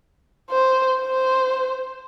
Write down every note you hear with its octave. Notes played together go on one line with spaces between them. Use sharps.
C5
C5